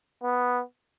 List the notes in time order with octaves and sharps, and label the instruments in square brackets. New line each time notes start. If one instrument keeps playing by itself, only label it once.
[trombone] B3